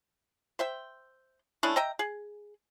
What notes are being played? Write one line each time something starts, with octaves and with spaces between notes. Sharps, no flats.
C5 E5 G5
A3 C#4 D4 E4
D#5 E5 G5 A#5
G#4